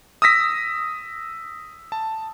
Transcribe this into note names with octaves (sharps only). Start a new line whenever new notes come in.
D#6 E6 A#6 B6
A5